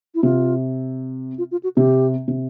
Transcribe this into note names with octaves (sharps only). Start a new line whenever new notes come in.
E4
C3 F4
F4
F4
F#4
C3 G4
C3